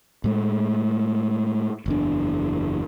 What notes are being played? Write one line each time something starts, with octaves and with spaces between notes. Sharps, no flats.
A2 G#3 A3
F#1 E2 D4